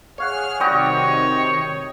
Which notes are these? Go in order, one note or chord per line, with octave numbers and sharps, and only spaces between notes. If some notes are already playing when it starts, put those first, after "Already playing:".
G#4 C#5 F5 F#5 F6
C3 D#3 G3 F#4 C#5 D#5 G5 C#6